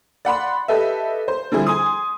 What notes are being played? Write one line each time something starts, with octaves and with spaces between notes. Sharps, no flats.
D5 F#5 B5 C6
G4 A4 B4 D#5 E5
C5
D3 F3 G3 C4 E4 G#4
G#5 C6 D#6